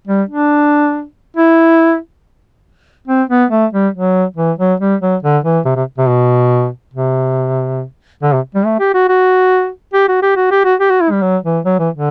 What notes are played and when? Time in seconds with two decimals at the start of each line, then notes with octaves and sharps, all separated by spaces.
0.07 G3
0.29 D4
1.37 E4
3.07 C4
3.29 B3
3.50 A3
3.73 G3
3.94 F#3
4.36 E3
4.59 F#3
4.80 G3
5.01 F#3
5.23 D3
5.44 E3
5.65 C3
5.76 C3
5.98 C3
6.08 B2
6.94 C3
8.23 D3
8.33 C3
8.55 G3
8.66 A3
8.80 G4
8.94 F#4
9.09 F#4
9.94 G4
10.08 F#4
10.22 G4
10.36 F#4
10.51 G4
10.65 F#4
10.80 G4
10.90 F#4
11.01 E4
11.11 G3
11.22 F#3
11.44 E3
11.65 F#3
11.79 E3
11.94 D3